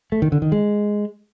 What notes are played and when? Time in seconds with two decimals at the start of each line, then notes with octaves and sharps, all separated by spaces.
0.12 A3
0.22 D#3
0.32 D3
0.42 D#3
0.52 G#3